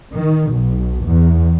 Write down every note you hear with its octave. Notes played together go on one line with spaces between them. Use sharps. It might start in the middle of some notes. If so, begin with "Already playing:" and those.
D#3
B1
E2